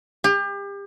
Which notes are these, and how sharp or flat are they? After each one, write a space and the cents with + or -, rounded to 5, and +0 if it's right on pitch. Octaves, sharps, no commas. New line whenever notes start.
G4 +35